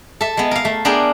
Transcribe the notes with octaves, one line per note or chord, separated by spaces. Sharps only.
A4 E5
G#3 B3
A#4 F5
A3
B3 D4 G#4 A#4 G5